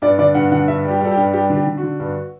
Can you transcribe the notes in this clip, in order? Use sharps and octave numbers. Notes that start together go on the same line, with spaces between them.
G2 D5
D3 D5
G2 F#5
D3 F#5
G2 E5
G3
G4
G3 A4
G4
G2
G3 G4
D3
G4
D3
F#4
D3
G2